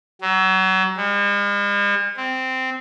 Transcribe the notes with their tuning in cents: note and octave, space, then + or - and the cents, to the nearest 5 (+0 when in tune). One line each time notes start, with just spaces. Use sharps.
F#3 +30
G#3 -45
C4 -10